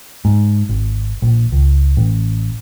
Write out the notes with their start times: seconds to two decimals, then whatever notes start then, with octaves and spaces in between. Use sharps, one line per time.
0.25 G#2
0.69 G#1
1.22 A#1
1.52 C#2
1.97 A1